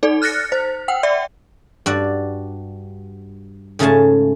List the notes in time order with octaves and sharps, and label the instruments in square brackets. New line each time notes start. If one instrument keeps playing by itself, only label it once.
[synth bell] D#4 A4 D5
F6 F#6 A6 A#6 C#7
C5
F#5 G5
D5 E5
[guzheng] G2 F#4 D5
G#2 C#3 A3 F5 G#5 A5